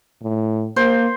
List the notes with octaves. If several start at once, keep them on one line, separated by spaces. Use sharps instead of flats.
A2
A#3 C5